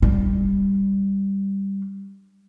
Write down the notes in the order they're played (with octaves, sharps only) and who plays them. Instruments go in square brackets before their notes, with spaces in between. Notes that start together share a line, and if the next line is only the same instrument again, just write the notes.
[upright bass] G3 D4